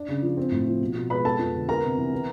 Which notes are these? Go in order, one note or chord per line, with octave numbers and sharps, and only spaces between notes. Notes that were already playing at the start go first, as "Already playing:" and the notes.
Already playing: D4
C#3
F3
C4
A2
F3
B2
B2
G#3 B4 B5
B3 A4 A5
F2
D3
B3 A#4 A#5
C3
E3
B3